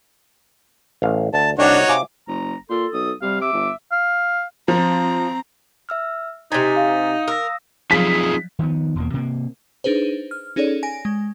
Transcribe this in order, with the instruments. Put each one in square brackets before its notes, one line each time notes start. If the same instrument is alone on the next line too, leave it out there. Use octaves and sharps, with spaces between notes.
[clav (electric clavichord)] A1 F5
[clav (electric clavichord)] D2 [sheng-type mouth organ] A5
[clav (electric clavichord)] C2 G4 G5 [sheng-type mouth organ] D4 [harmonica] D#4 F#4 C#5
[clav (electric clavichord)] C3 F5 G#5 [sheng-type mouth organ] D6
[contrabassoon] F#1 [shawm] A#5
[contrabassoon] A#2 [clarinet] A4 [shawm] C6
[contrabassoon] B1 [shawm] D#6
[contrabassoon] C3 [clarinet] G3 [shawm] F5
[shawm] E5 [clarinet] D6
[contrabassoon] G1
[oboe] F5
[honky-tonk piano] F3 [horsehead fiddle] C4 A#5
[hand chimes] E5 E6 F6
[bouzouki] C3 G#5 [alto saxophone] D#4 [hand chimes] A#5 A6 B6
[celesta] F5
[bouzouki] A#4 [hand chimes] D#6 E6 A#6
[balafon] F3 F#3 F5 [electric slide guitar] C4 D#4 F4 [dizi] G#4 [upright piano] B6
[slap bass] D#3 F3 B3
E1 E2 A#3
C3 A#3
[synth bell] D4 D#4 G#4 B4 C5
F6
C#4 D#4 G#4 A4 C#5 D5
G#5 A#6 D7
G#3